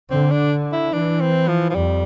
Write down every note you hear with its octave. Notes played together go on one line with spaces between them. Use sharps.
D3 C4
D4
E4
E3 D4
C4
F3
F3
F2 G3